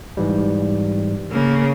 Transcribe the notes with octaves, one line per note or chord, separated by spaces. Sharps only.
G#2 E3 G3
C#3 A#3